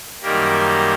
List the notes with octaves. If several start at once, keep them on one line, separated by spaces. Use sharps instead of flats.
F#2 D#3 G3 A#3 G4 A#4